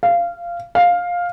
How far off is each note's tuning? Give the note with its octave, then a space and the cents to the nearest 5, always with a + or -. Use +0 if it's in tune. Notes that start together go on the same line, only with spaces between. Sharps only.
F5 -15
F5 +10